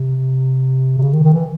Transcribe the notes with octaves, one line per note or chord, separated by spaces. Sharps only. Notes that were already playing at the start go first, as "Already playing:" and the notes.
Already playing: C3
C3
C#3
D#3
D#3
E3